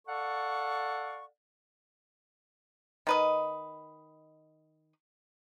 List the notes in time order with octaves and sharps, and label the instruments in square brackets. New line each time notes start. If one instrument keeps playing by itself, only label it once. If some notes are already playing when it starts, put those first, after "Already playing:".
[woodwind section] A4 D5 F5 F#5 C#6
[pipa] D#3 B4 D#5